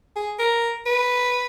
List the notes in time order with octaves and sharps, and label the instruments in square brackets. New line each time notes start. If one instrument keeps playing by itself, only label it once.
[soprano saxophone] G#4
A#4
B4